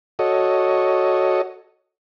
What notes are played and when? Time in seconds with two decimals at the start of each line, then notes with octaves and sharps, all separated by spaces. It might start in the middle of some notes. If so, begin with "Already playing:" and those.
0.19 F#4 A4 C#5 D#5